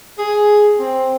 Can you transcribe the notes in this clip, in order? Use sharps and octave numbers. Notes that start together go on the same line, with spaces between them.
G#4
C4